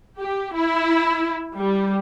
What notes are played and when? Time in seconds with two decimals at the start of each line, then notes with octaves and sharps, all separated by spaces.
0.19 G4
0.55 E4
1.55 G3